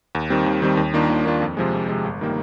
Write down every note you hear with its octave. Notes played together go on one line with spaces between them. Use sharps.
D#2
D#3 G3 C4
D#2
D#3 G3 C4
D#2
D#3 A#3 D4 F4
D#2
D#3 A#3 D4 F4
F2
C3 F3 G#3
F2
C3 F3 G#3
G1
D#3 G3 A#3